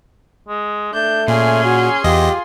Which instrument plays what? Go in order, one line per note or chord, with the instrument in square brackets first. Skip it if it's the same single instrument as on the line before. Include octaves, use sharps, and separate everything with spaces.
[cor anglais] G#3
[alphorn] A3 [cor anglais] D4 [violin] G6
[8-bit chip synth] A#2 [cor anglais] C#4 [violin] G#4 C6
[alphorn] F#4
[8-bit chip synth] E2 D#5 [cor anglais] F4 [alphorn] G4